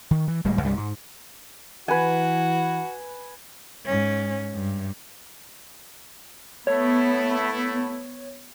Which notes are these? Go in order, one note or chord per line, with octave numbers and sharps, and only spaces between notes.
D#3
E3
D1 A2 G3 G#3
C2 G2 G3
G#2
E3 F#4 B4 G#5
G#2 C#4
G2
A3 B3 E4 C#5